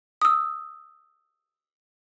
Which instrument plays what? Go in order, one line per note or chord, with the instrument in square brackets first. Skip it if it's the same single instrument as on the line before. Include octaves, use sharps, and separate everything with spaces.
[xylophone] D#6 E6